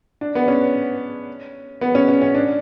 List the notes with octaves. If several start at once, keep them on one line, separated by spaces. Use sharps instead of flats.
D4
B3
C#4
B3
C#4
C#4
C#4
D4